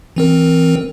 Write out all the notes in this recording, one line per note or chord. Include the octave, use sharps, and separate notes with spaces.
E3 C4 A#4